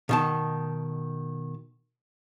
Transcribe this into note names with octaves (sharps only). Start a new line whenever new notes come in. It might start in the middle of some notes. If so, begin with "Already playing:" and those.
B2 D#3 A5